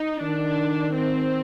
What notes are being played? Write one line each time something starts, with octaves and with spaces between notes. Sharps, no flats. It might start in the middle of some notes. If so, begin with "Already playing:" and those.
Already playing: D#4
D#3 D4
C4